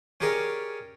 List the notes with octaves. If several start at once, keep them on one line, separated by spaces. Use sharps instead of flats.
C#4 G4 G#4 A#4 C#5 D5